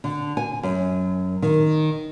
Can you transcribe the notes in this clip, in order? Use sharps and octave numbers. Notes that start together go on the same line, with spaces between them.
D3
G#5
F#2
D#3